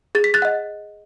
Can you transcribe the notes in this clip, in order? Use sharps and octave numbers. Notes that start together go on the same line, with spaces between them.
G#4 A6
B6
F#6 A6
D#5 F#5